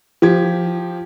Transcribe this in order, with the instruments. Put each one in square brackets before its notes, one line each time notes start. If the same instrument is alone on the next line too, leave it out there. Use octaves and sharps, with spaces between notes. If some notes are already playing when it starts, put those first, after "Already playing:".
[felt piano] F3 G4 G#6